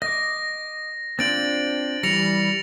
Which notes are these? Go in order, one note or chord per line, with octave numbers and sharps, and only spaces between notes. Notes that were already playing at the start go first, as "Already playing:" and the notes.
D#5 D6 A#6
C4 D4 F4 A6 D7 F#7
E3 G3 A#6 C#7 F7